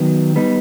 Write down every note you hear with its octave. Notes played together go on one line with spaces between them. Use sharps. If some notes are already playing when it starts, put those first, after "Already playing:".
Already playing: D#3 F#3 B3
G3 B3 D#4